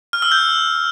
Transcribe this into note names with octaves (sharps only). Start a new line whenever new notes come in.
F6
E6
G6